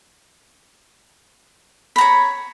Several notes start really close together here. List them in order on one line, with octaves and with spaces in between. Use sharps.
B5 A#5 C#5